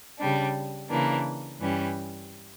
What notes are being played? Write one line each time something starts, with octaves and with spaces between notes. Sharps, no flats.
C#3 G3 D4
C#3 E3 A#3 D4
G2 E3 G3 C#4